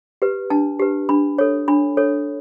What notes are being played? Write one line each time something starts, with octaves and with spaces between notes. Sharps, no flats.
G4 B4
D4 A5
G4 B4
D4 B5
A4 C#5
D4 B5
A4 C#5